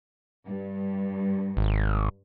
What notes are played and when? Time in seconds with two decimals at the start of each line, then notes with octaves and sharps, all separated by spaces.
0.47 G2
1.57 G#1